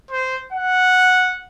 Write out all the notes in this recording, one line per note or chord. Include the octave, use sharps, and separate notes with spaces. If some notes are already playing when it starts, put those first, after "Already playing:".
C5
F#5